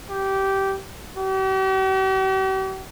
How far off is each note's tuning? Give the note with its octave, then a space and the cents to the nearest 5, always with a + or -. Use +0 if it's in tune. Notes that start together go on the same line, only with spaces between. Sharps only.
G4 -15
G4 -45